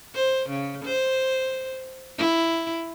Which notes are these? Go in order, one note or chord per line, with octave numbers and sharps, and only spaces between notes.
C5
C#3
C5
E4